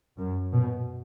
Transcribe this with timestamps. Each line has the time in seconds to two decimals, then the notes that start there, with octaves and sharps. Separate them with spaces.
0.18 F#2
0.52 B2